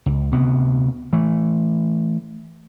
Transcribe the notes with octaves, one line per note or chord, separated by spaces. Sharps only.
C#2
D2 C3 B3
E3 A3